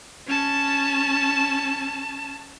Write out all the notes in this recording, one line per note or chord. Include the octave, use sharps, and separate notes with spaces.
C#4 A5